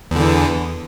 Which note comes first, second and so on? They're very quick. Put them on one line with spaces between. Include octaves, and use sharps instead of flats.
E2 D3 E3